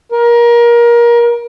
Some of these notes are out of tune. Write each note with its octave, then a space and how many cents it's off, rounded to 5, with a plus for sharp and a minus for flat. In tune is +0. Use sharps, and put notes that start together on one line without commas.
A#4 +25